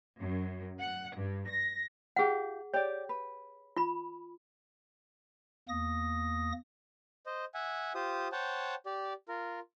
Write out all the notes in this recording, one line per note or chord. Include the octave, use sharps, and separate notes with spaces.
F#2
F#5
G2
A#6
F4 G4 G#4 F#5
G4 C#5 D5
B4
F4 B5
E2 A#3 D#6 A#6
C5 D#5
E5 F#5 G#5
F4 G4 C5 D#6
C5 C#5 F#5 G5 A5
G4 D5
F4 A#4